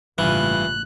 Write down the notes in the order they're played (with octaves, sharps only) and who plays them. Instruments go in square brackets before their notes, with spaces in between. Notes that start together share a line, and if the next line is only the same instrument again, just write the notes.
[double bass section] A1 C#3 A#3 [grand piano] G2 F4 [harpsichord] E3 [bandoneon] F#6